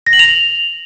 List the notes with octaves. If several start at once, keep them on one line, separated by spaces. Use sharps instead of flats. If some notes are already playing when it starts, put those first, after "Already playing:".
A#6
F#7
F7